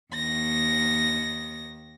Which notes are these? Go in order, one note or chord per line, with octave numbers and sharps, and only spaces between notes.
D#2 A#6